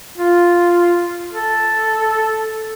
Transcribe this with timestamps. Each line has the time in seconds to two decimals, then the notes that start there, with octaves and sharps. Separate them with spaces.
0.18 F4
1.32 A4